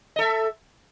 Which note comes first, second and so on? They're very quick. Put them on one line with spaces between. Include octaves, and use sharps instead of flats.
D#5 A4 E5